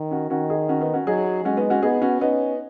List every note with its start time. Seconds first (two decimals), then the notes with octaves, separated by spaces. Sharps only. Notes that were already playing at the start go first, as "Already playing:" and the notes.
Already playing: D#3
0.11 C#4 F#4
0.30 D#3 C#4 F#4
0.50 D#4 G#4
0.69 C#4 F#4
0.81 B3 D#4
0.94 C#4 F#4
1.06 F#3 D#4 G#4
1.45 G#3 C#4 F#4
1.57 B3 D#4
1.70 C#4 F#4
1.83 B3 D#4 G#4
2.02 C#4 F#4
2.21 B3 C#4 D#4